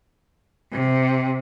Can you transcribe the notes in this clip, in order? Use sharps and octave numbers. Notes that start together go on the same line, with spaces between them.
C3